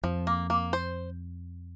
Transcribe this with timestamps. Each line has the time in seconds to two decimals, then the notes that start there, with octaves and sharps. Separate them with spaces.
0.03 F2 F3
0.27 A#3
0.50 A#3
0.73 C5